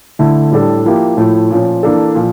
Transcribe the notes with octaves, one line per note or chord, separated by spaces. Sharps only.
D3 A3 E4
A2 G3 D4 A4
F3 A#3 E4 G4
A2 F3 A3
A#2 F3 C#4
E3 A#3 D4 A4
A#2 F3